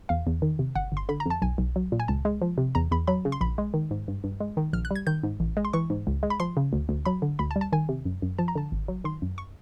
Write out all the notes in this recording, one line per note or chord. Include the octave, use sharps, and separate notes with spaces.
E2 F5
E2
D#3
C3
G1 F#5
G1 C6
D3 B5
A#5
F2 A5
B1 G#5
B1
F#3
A#2
G#5
C#2 A5
G#3
F3
C3
E2 A#5
E2 B5
F#3 B5
C#3
C6
A#1 B5
G#3
D#3
G#2
G2
G2
G#3
D#3
A#1 F6
F#6
G3 G#6
D#3 G6
G#2
A1
G#3
C6
E3 C#6
G#2
C#2
G#3
B5
F3 C6
C#3
D2
D2
F#3 B5
D3
D2 B5
A5
G3
A5
D#3 G#5
C3
F#2
F#2
F3 A5
A#5
D3 A5
G#1
F#3
D#3 C6
F#2
C#6